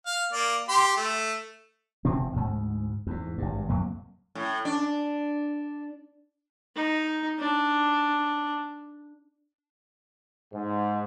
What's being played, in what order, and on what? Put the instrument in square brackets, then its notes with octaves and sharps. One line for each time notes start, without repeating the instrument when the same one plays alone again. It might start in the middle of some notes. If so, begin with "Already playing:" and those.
[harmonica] F5
A#3 D5
G4 C6
A3
[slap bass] E1 C3 C4
D2 G#2
E2 G#2
G#1 G2
C2 F2 F#3 A#3
[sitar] A2
D4
[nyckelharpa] D#4
D4
[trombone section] G#2